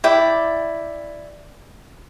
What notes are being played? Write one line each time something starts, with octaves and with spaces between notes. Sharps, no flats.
E4 D5 G5